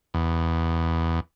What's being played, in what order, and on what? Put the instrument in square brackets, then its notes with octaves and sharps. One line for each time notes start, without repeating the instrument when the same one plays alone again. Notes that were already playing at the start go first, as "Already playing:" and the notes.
[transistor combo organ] E2